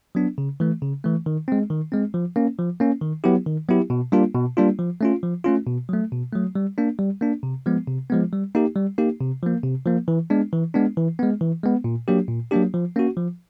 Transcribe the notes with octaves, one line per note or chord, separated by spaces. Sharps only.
F#3 B3 D4
C#3
E3 A3
C#3
E3 A3
D#3
G#3 C4
D#3
G#3 C4
F3
A#3 C#4
F3
A#3 C#4
D#3
F#3 B3 E4 G4
D#3
F#3 B3 E4 G4
B2
G3 A#3 D4 F4
B2
G3 A#3 D4 F4
F3
A3 C#4 F4
F3
A3 C#4 F4
B2
F#3 A3
B2
F#3 A3
G3
A#3 D4
G3
A#3 D4
C3
F3 G#3 B3
C3
F3 G#3 B3
G3
A#3 D#4 G4
G3
A#3 D#4 G4
C3
F3 A#3
C3
F3 A#3
E3
G#3 B3 D4
E3
G#3 B3 D4
E3
G#3 B3
E3
G#3 B3
A#2
F#3 A#3 D4 G4
A#2
F#3 A#3 D4 G4
F3
A#3 C#4 F#4
F3